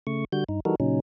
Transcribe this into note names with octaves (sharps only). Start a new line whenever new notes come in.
C#3 A3 C#6
D3 G3 F#4 G6
G2 D#4
E3 G3 D#4 F#4 A4 A#4
A#2 C#3 F#3 C#4 D#4